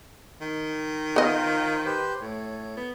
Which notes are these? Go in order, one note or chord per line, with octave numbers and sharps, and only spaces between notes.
D#3
B3 F4 C5 D#5
G4 B4 C5
A2 C#5
B3